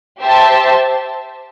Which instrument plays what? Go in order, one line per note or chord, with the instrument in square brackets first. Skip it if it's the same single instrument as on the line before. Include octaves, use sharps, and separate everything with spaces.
[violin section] G4 C5 E5 A5